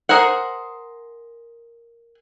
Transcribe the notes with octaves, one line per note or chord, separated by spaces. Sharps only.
G#4 A#4 C5 F#5